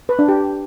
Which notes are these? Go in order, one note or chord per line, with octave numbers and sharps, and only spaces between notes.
B4
D4
G4